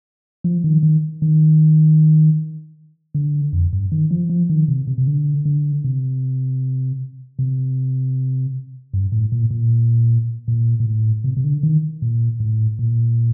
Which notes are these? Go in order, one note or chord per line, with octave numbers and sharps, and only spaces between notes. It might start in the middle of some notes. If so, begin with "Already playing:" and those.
F3
D#3
D#3
D#3
D3
F2
G2
D#3
F3
F3
D#3
C3
C3
C3
D3
D3
C3
C3
G2
A2
A#2
A#2
A#2
A#2
A2
C3
C3
D3
D#3
A#2
A2
A#2